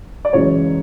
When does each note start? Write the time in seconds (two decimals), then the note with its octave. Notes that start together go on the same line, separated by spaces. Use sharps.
0.25 D5
0.33 F#2 C#3 E3 G#3 C#5